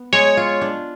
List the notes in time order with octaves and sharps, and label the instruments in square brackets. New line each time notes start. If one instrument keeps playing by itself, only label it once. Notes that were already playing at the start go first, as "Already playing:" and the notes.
Already playing: [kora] B3
[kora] G#3 [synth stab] C#5
[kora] F4
D4